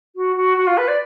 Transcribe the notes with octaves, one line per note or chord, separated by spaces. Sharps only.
F#4
F#4
F#4
F4
B4
D5